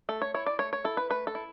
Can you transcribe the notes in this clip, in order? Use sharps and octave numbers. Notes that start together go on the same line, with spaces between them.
A3 A4
C#5
E4 C#5
D5
A3 C#5
C#5
E4 A4
B4
A3 B4
A4
E4